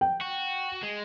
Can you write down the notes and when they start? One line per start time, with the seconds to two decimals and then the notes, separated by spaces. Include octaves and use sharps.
0.01 G5
0.21 F#4
0.83 G#3